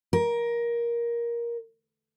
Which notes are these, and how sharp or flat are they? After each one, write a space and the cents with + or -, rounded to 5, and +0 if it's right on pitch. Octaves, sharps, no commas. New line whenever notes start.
A#4 +15